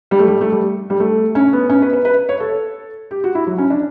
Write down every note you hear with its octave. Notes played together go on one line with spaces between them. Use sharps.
G3
A3
G3
A3
G3
G3
A3
C#4
B3
C#4
B4
B4
B4
C#5
A4
G4
F#4
E4
F#3
C#4
D4